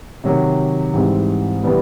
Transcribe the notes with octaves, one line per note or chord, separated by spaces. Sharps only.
C3 D#3 F#3
G#2 E3 G3 C4
C3 E3 G3 B3 D4